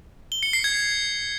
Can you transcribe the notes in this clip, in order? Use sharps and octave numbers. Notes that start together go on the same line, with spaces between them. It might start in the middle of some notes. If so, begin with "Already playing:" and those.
G7
C#7
C7
G#6